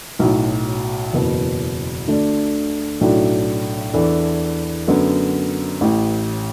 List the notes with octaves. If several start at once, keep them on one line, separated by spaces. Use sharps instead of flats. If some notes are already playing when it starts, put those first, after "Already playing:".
B1 A2 F#3
F#1 E2 B2 B3
D2 D3 A3 D4
B1 A2 F#3 D4 A4
E2 E3 D4 A4
F#2 D3 B3 F#4 A4
A1 A2 E3